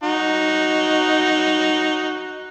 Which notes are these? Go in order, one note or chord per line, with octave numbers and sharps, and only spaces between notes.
D#4 F#4